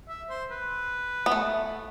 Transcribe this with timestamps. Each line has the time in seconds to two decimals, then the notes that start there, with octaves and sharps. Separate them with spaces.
0.09 E5
0.30 C5
0.51 B4
1.26 B3
1.32 A3